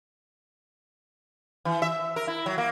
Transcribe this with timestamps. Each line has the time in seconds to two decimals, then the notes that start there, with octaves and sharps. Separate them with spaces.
1.65 E3
1.82 E5
2.16 A#4
2.27 E4
2.46 F#3
2.58 A#3